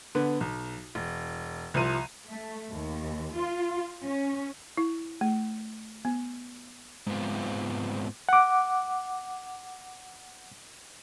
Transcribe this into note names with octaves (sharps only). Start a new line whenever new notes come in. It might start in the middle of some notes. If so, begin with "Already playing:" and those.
D3 B3
B1
E1
C2 C3 F3 D#7
A3
D#2
F4
C#4
E4
A3
B3
G#2 G#3 B3 C4 F4
F#5 D6